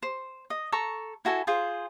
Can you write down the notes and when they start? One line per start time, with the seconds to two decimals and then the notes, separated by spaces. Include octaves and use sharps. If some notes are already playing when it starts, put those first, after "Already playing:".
0.03 C5
0.50 D#5
0.72 A4 A#5 C#6
1.25 E4 F#4 A4 G#5
1.47 F4 G#4 C5